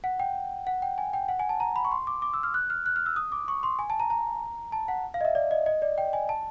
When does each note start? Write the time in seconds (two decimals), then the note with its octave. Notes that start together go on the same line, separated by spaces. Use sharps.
0.04 F#5
0.20 G5
0.67 F#5
0.82 G5
0.98 G#5
1.13 G5
1.29 F#5
1.39 G#5
1.49 A5
1.60 A#5
1.76 B5
1.85 C#6
1.91 C6
2.07 D6
2.22 D6
2.33 E6
2.43 F6
2.54 F#6
2.70 F6
2.86 F#6
2.96 F6
3.06 E6
3.16 D#6
3.32 D6
3.48 C#6
3.63 C6
3.79 G#5
3.90 A5
4.00 A#5
4.10 A#5
4.72 A5
4.88 F#5
5.14 F5
5.21 D#5
5.25 E5
5.35 D5
5.51 D#5
5.66 D#5
5.82 D5
5.98 G5
6.13 G#5
6.29 A5